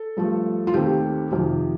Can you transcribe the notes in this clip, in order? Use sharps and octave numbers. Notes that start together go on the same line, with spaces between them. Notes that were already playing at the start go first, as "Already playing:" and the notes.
Already playing: A4
G2 F3 A3
F4
D#2 D#3 A3 C4 G4
F2 C3 D#3